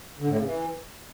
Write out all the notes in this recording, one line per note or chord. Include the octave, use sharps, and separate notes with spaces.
D3
A2
C#3
E3